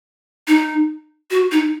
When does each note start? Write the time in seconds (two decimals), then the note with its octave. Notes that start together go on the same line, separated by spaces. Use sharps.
0.48 D#4
1.31 F#4
1.52 D#4